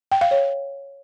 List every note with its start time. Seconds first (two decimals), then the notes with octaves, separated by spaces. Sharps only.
0.12 G5
0.21 F5
0.31 C#5